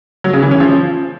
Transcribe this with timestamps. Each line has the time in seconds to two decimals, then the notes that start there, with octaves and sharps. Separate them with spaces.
0.24 F#3
0.33 C#3
0.42 E3
0.51 C#4
0.60 F3